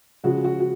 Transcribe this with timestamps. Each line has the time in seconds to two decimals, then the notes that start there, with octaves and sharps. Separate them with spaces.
0.24 C#3 F3 G#3 F#4
0.44 F#4
0.60 F#4